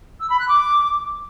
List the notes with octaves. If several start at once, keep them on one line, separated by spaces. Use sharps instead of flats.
E6
B5
F#6
D6